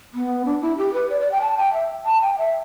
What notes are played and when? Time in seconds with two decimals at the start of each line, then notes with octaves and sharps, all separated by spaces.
0.14 B3
0.45 D4
0.61 E4
0.78 G4
0.93 B4
1.10 D5
1.20 D5
1.32 G5
1.41 A5
1.57 G5
1.73 E5
2.05 A5
2.22 G5
2.38 E5